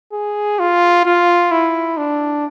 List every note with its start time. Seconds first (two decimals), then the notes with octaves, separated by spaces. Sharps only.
0.13 G#4
0.59 F4
1.06 F4
1.52 E4
1.97 D4